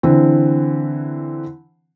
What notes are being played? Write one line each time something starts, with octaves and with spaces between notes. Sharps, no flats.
D3 E3 C4